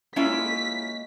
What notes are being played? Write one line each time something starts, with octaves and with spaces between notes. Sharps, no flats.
G#3 A#3 C#4 E4 F4 E5 B6